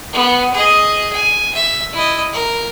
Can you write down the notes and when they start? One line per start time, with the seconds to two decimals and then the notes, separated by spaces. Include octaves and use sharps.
0.13 B3
0.54 G#4 D#5
1.13 G#5
1.55 E5
1.93 E4 D#5
2.33 A#4